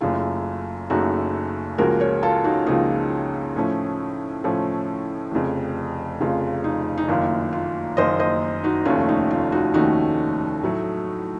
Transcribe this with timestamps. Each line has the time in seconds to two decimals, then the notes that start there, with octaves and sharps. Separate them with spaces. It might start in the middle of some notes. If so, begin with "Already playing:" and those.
0.01 F#1 F#2 C#3 A3 F4
0.90 F#1 F#2 C#3 A3 D#4 F#4
1.78 C#2 C#3 F3 A#3 F#4 A#4
2.00 A#4 C#5
2.23 F4 A4
2.44 D#4 F#4
2.66 C#2 C#3 F3 A#3 D#4
3.56 A2 F3 A3 C#4
4.44 A2 F3 A3 C#4
5.32 F1 F2 C#3
6.21 F1 F2 C#3 F4
6.64 D#4
6.98 D#4
7.08 F#1 F#2 D#3 A#3 F4
7.53 F4
7.97 F#1 F#2 D#3 A#3 C5 D#5
8.19 C5 D#5
8.64 D#4 F#4
8.85 F1 D#2 D#3 A3 C#4 F4
9.09 D#4
9.31 F4
9.52 D#4 F#4
9.74 F1 D#2 D#3 A3 C#4 D#4 F#4
10.63 A2 F#3 A3